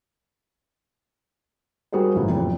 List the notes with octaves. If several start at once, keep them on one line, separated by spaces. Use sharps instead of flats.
G3 F#4 G#4 A#4 C5
G1 A2 C#3 E3
F#1 F2